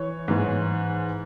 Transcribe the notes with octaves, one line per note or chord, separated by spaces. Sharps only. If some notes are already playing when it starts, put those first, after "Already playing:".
Already playing: E3 C#5
G#2 E3